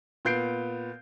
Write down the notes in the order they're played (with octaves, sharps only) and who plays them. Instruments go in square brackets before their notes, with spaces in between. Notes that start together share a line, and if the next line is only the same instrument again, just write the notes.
[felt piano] A#2 B3 G6 C7 D7